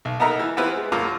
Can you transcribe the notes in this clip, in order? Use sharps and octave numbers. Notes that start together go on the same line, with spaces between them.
B1
B3 D#4 A4 A#4 E5 A#5
E3
B3 C4 E4 F4 G4 B4
G#3
A#1 F#2 A#3 F4 D6